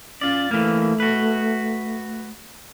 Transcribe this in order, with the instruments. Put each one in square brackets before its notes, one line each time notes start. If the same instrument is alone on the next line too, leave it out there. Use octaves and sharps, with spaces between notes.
[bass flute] C#4 [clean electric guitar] F4 D5
[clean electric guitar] E3 A#3 [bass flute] A3
[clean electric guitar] F#4 B4